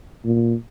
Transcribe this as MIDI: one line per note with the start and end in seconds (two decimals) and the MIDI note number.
0.25 0.54 46